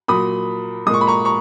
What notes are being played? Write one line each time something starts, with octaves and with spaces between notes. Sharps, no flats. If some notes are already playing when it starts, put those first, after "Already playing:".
A#2 F#3 B5 D#6
A#2 G#3 C#6 D#6
B5
A#5 C#6
A#5 C#6